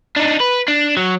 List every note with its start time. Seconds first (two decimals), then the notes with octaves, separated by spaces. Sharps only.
0.17 D4 D#4
0.40 B4
0.68 D4
0.97 F#3